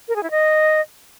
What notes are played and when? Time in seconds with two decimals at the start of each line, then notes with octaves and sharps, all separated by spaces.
0.08 A#4
0.16 G#4
0.23 E4
0.31 D#5